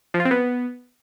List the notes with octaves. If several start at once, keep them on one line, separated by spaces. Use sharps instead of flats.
F3
F4
C4
B3